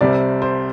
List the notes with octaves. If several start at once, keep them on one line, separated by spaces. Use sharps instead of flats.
C2 C3 G3 C4 D5
C5